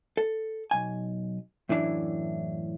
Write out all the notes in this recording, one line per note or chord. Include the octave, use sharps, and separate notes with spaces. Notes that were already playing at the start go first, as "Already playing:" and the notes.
A4
B1 G#5
F#2 A2 E3 D4